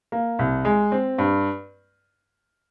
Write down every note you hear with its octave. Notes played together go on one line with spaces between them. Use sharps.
A#3
C2
G#3
C4
G2